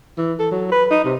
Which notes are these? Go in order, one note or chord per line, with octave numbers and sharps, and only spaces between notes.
E3
A4
F#3
B4
D#4
C3